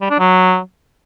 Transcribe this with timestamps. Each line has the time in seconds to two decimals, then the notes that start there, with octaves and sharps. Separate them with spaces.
0.01 G3
0.10 D4
0.19 F#3